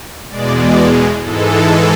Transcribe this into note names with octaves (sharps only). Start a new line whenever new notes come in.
E2 B2 G#3 D5
D5
G#2 E3 G#3 A4